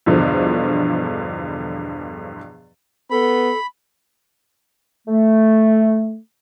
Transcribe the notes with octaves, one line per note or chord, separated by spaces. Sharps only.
E2 G2 B2 D3 F3
B3 A4 B5
A3